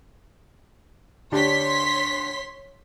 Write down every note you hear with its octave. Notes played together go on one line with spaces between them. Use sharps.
D2 D4 G4 C#5 C6 B6